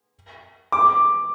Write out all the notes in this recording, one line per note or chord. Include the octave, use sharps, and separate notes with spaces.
D6